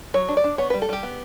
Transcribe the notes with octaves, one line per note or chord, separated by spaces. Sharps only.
F#3 C#5
D4
D5
D4
B3 C#5
G3 B4
A4
G3 G4
B3